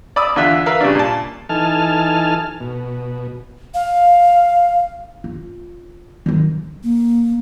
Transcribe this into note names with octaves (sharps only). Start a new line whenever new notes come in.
D5 B5 D#6 E6
E2 D3 F4 E5 F#6
A#4 B4 E5 F5
C#3 G3 D4
A#2 A5
E3 D#4 A4 G#5 A5 F6
B2
F5
F4
D#3 F#3
A#3